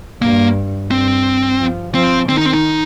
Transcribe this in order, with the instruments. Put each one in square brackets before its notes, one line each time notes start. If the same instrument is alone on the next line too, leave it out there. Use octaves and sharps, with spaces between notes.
[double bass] G2 [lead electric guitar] A#3
[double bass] G2 [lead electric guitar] C4
[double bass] F3
[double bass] F3 [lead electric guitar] C4
[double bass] D#3 [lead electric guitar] C4
[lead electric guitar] D#4
C4
D#4